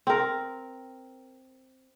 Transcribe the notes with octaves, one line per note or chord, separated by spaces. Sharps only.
C4 A#4